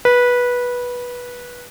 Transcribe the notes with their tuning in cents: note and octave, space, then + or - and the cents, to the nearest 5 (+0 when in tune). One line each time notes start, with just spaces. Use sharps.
B4 -15